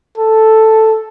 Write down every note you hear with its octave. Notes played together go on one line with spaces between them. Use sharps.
A4